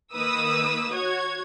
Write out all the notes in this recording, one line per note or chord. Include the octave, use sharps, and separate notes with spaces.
D#3 A#3 B4 D#6 E6
F#4 C#5 G#6